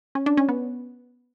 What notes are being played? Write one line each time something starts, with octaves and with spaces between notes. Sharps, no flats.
C#4
D4
C#4
B3